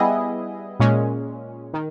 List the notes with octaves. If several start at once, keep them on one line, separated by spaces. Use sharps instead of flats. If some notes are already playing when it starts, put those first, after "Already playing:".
Already playing: G3 B3 E4 G#4 D#5
A#2 G#3 C#4
D#3